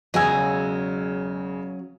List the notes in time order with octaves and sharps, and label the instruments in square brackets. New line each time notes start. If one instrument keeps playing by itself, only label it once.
[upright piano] E1 C#3 E6 [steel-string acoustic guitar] F#3 C#4 F#4 [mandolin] D#5 G#5